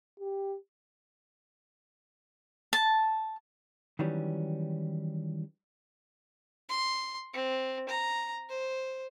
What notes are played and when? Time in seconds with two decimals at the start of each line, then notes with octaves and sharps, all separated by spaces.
0.20 G4
2.73 A5
3.99 D#3 E3 F#3 G3 C#4
6.69 C6
7.33 C4
7.89 A#5
8.49 C5